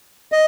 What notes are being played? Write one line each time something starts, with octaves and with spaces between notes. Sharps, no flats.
D#5